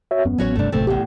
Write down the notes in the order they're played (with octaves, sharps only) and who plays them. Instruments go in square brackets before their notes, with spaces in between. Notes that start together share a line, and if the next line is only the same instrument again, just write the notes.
[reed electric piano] F#4 C#5 E5
[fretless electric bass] E1 F#2 C#4 [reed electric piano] B3
[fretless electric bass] A1 F#3 [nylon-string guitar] C#4 F#4 C#5
[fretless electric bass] F#1 G2 C3 [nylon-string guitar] A3 D4
[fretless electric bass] D1 A1 C3 [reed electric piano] D2 G2 [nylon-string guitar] A3 C4
[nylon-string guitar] E2 A2 [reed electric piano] G4